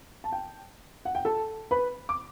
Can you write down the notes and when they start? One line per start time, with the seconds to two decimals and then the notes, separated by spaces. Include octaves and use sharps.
0.24 A5
0.32 G5
1.05 F#5
1.15 G5
1.25 A4 A5
1.71 B4 B5
2.09 D6